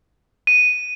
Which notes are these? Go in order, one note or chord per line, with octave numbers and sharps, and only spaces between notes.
D#7